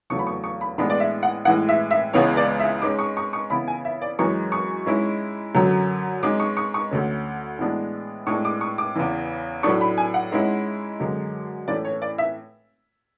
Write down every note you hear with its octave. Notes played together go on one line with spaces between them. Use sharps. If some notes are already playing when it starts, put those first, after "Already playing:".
E2 C#3 F#3 A3 C#6
B5
C#6
C#6
B5
A2 E3 G#3 B3 D4 B5
D5
E5
F#5
A2 E3 G#3 F#5
E5
E5
C#2 C#3 E3 G#3 B3 C#5
D5
E5
G#2 G#3 C#4 D6
C#6
C#6
C#6
C#3 E3 B3 E4 B5
G#5
E5
D5
F#2 E3 G#3 C#4 C#6
C#6
G#2 G#3 C#4 E4
F#2 D3 F#3 C#4
G#2 G#3 C#4 D6
C#6
C#6
C#6
D2 D3 A3 C#4
A2 E3 G#3 B3 D4
A2 G#3 D4 C#6
D6
C#6
D6
E2 C#3 E3
A2 F#3 A3 D4 C#6
B5
G#5
F#5
G#2 G#3 C#4 E4
F#2 D3 G#3
A2 E3 A3 C#4 D5
C#5
D5
E5